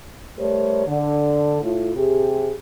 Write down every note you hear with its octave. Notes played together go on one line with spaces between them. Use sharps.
G3 A3 G4 A#4 C5 C#5
D3
A2 F4
C3 G4 G#4